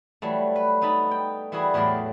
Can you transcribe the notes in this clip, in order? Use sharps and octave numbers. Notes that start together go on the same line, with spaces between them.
E3 F#3 G3 A3
B4
B3 D#4 E5 A5 B5
G5
E3 G3 E4 F#4 G#4
E2 A2 F#3 G4 D5 C6